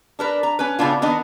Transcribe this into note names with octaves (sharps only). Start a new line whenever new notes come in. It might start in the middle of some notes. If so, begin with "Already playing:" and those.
D4 A#4 B4
A#5
C#4 B4
A2 C#3 B3 D4 F4
D#3 B3 D4 D#5